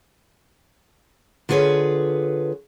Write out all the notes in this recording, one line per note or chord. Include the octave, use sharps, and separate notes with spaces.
D3 F4 G#4 B4 C#5